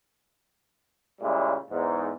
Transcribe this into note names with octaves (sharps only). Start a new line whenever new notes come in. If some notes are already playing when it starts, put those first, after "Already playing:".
A#2 C#3 G3 G#3 E4
E2 G#2